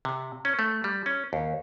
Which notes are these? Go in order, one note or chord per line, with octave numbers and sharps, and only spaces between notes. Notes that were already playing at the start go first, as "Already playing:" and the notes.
C3
C#4
A3
G3
C#4
D#2